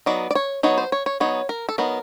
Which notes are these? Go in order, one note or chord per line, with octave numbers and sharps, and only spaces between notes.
F#3 B3 D#4 D5
D5
C#5
F#3 B3 D#4 C#5
C5
C#5
C#5
F#3 B3 D#4 C#5
A#4
A4
F#3 B3 D#4 A#4